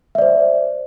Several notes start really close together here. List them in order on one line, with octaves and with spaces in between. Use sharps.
E5 D5 C5